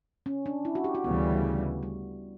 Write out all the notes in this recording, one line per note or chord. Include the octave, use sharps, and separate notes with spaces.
C#4
D4
E4
F#4
G4
F#4
D2 C#3 E3 G3 B3
G3